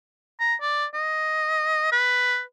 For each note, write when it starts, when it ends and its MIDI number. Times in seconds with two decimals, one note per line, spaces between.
0.40 0.55 82
0.61 0.86 74
0.94 1.89 75
1.92 2.42 71